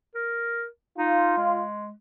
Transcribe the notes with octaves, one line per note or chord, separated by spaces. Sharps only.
A#4
D#4 F4
G#3